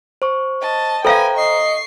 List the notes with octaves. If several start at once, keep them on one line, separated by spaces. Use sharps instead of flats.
C5 C#6
D#5 A5
A4 B4 C5 E5 F5 G5 G#5 A#5
D#5 C#6 C7